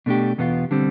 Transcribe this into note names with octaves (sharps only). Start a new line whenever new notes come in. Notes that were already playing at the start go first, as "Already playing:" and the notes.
B2 A3 D4 G4
E2 B2 B3 F4
D3 G3 C4